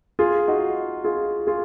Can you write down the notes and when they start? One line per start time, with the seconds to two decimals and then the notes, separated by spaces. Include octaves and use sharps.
0.19 F4 G#4
0.48 D#4 F#4
1.04 F4 G#4
1.47 F4 G#4